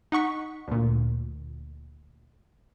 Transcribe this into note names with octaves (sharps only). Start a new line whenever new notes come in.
D#4 F#5 C#6 B6
D2 A#2